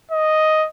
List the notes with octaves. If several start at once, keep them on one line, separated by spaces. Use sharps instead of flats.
D#5